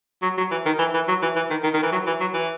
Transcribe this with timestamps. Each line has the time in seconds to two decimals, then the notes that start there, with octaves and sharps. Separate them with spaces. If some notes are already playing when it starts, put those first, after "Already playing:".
0.22 F#3
0.38 F#3
0.51 E3
0.66 D#3
0.79 E3
0.94 E3
1.08 F#3
1.22 E3
1.36 E3
1.50 D#3
1.64 D#3
1.74 D#3
1.83 E3
1.92 F#3
2.06 E3
2.21 F#3
2.34 E3